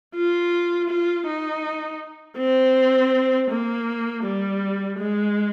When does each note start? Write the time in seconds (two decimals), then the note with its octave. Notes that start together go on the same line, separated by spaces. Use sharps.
0.15 F4
0.89 F4
1.27 D#4
2.38 C4
3.50 A#3
4.24 G3
4.99 G#3